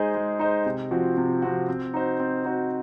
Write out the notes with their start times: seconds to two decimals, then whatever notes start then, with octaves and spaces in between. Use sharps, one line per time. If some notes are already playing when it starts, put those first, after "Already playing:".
Already playing: G#3 D#4 G#4 C5 D#5
0.15 G#3
0.39 D#4 G#4 C5 D#5
0.66 C3
0.91 F3 C4 F#4
1.17 C3
1.42 F3 C4 F#4
1.68 C4
1.94 D#4 F#4 C5
2.20 C4
2.45 D#4 F#4 C5